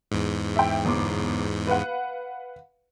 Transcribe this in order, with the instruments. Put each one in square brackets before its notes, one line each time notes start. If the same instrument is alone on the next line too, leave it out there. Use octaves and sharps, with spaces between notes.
[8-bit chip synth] E2 G#2
[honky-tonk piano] E5 G5
G1 D6
B4 F5 F#5